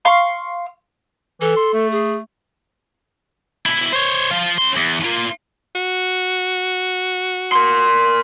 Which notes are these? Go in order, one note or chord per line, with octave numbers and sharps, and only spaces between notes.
F5 C6 C#6
E3 A4
C6
A3
G#4
B2 E4
C5 C#5
F3 F4
C#4 C6
E2
A#3 F4
F#4
A#4 C6